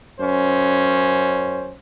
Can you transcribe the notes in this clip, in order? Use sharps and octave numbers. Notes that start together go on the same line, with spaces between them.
F#2 C#4 C5